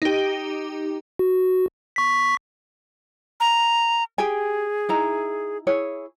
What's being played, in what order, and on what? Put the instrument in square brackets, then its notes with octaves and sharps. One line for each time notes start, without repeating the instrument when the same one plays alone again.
[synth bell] D#4 G4
[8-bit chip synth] F#4
C#6 B6
[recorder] A#5
[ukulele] G4 G5 G#5 [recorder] G#4
[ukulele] D#4 E4 A#5
E4 G#4 C#5